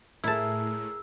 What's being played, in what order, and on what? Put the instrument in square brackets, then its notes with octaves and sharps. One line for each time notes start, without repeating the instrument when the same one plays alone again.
[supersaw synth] A2 [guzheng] E4 A5 [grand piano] G#4 A#4 [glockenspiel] E6